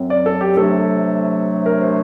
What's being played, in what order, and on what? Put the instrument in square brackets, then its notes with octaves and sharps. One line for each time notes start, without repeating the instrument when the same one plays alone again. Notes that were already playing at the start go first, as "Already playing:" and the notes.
Already playing: [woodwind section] F#2 F#3 C4
[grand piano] D5
A4
G4
[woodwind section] C3 F#3 A3 D4 [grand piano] A4
[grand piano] A#4
C5